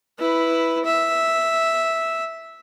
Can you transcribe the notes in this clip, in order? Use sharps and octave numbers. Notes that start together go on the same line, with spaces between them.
E4 B4
E5